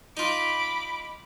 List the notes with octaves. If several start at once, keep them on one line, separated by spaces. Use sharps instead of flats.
D#4 F4 B5 D6